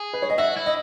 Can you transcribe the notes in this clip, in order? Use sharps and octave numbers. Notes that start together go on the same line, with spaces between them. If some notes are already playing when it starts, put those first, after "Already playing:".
Already playing: G#4
B4
C#5
D#5
F#4 E5
E4
D#5